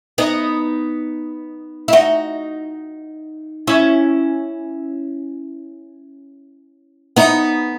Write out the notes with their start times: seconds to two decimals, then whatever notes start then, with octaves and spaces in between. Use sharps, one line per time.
0.18 B3 D#4
1.88 E4
1.93 D#4 F#4
3.67 C#4 E4
7.16 B3 D#4